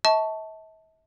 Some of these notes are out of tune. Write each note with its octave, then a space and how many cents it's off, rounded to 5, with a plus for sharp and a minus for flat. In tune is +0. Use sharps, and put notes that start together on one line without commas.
E5 -45 A5 +0 C#6 +5